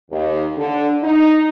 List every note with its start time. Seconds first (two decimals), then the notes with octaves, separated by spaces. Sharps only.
0.11 D#2
0.57 D3
1.03 D#4